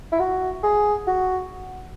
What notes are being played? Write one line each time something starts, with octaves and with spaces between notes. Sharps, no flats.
E4
F#4
G#4
F#4